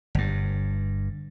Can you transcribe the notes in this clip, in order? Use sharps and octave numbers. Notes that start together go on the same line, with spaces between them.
G1 G2